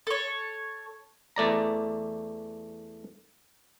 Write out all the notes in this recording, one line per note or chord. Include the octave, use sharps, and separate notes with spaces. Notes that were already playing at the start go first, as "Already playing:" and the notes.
A4 C#5
E2 A3 D5 A#5